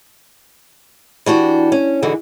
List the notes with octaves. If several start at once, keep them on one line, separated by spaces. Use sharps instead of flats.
E3 D4 F#4 G4
C#4
G#2 D3 E3 F#4